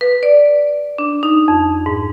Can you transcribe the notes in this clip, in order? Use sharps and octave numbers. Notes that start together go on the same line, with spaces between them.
B4
D5
D4
D#4
F2
G#2